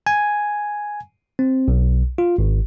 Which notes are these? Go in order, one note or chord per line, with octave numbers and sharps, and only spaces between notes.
G#5
C4
B1
F4
G#1